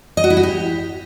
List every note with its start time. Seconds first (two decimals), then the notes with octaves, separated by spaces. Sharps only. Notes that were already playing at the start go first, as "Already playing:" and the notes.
0.17 D#5
0.24 F#4
0.30 E4
0.37 F#4
0.43 G4